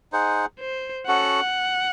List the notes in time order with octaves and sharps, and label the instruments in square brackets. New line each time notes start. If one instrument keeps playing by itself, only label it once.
[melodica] D#4 G#4 C5 F#5
[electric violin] C5
[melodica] C#4 F#4 A4 [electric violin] F#5